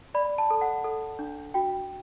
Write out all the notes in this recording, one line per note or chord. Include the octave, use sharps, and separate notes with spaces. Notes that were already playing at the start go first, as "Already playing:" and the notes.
D5 B5
A5
A4
F#5
A4
D4
F#4 G5